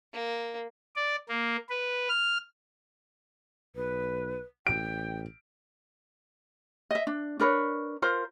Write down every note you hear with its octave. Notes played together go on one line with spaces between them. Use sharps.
A#3
D5
A#3
B4
F6
B1 B4
A1 G5 D7
D#5 E5
D4
D4 A#4 B4 C#5
F4 A#4 C5